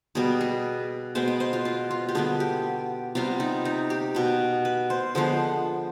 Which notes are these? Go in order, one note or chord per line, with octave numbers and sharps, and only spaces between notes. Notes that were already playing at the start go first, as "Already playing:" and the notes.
B2 G3 B3 G#4
G#4
B2 G#3 B3 C5
B4
C5
F4
F4
F4
G4
D3 G3 B3 G#4
G4
C3 G3 B3 F4
D#4
D#4
G4
B2 B3
B4
C5
D3 F3 G#3 B3 C5